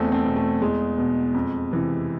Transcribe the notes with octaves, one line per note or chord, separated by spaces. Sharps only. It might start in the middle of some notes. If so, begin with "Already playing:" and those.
Already playing: E2 A3 C4
A3 C4
B2
A3
E2 G#3
B2
F2
C3 E3